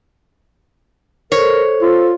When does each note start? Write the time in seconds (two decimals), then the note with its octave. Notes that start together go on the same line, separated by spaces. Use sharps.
1.32 A4 A#4 C5 C#5
1.82 F4 A4 C5